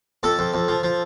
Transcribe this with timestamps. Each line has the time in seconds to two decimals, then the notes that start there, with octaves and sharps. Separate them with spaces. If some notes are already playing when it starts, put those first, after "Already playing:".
0.23 F2 A4
0.39 F2
0.54 F2
0.68 F3
0.83 F3